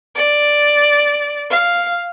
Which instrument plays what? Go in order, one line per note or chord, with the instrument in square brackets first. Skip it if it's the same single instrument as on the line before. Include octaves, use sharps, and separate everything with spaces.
[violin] D5
F5